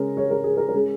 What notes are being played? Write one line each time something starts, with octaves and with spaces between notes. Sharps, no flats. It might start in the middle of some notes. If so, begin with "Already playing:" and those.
Already playing: C#3 G#3 C#4 A#4
C#5
A#4
G#4
A#4
A#4
G#3 C#4 G#4